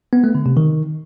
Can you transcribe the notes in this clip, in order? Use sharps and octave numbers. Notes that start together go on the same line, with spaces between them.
B3
A3
D3
C3
D#3